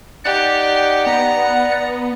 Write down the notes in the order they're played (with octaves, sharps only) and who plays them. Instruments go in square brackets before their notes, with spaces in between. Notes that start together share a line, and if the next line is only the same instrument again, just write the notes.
[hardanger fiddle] D#4 G4 [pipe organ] D5 F#5 F#6
[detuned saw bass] B3 [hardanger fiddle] A#5